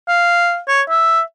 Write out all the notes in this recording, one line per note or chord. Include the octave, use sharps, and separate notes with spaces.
F5
C#5
E5